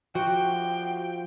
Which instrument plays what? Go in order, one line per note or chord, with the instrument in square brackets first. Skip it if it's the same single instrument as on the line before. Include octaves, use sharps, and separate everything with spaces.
[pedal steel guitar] F3 G4 [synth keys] F#4 [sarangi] G5